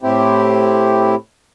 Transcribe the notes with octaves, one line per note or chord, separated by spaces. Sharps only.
A2 C4 E4 G4